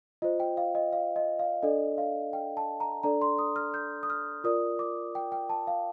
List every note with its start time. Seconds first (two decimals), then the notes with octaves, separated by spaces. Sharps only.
0.22 F4 C5 D#5
0.40 G5
0.57 F5
0.75 D#5
0.93 F5
1.16 D#5
1.39 F5
1.62 D4 A4 D5 D#5
1.98 F5
2.33 G5
2.57 A5
2.80 A#5
3.03 D4 A4 D5 A#5
3.22 C6
3.39 D#6
3.56 F6
3.74 G6
4.03 D#6
4.10 F6
4.44 F4 A#4 D5 D#6
4.79 D6
5.15 G5
5.32 G5
5.50 A5
5.67 F5